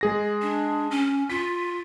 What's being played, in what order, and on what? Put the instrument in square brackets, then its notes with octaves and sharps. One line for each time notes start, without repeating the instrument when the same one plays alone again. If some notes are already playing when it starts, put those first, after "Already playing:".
[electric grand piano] G#3 G#4 A#6
[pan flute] D4
C#4
[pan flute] F4 [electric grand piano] B6